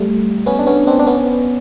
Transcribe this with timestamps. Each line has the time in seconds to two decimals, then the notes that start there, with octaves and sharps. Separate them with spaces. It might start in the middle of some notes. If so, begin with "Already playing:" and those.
Already playing: G3 A3
0.46 B3 C#4
0.59 D4
0.67 B3 C#4
0.87 C4 D4
0.99 D4
1.07 B3 C#4